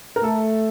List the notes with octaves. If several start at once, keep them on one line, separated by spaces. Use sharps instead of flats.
A#4
A3 A4